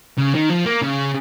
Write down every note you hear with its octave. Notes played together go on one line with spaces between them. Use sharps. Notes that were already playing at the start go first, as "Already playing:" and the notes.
C#3
D#3
F3
A#3
C#3